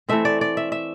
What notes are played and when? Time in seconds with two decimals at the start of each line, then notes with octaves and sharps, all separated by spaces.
0.09 E3 A3 C4 E5
0.25 D5
0.41 D5
0.57 E5
0.72 E5